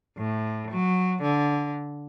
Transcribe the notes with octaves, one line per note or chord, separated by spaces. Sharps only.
A2
F#3
D3